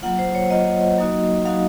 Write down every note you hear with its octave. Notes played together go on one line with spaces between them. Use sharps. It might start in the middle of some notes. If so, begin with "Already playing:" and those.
F#3 A#3 F4 F#5
C5
C#5
F#3 A#3 F4 D#5
F#3 A#3 D#4 F#4
F#3 A#3 D#4 F#4 F5